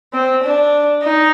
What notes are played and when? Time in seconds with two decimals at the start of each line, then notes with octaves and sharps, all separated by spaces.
0.13 C4
0.43 D4
1.03 D#4